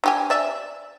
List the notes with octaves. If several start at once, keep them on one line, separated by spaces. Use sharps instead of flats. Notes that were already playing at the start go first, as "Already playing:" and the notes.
D4 G4 G#5
D5 E5